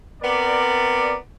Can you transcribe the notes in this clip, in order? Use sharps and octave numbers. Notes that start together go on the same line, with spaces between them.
B3 C4 A#4 D5